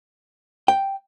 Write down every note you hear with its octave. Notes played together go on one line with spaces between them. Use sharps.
G5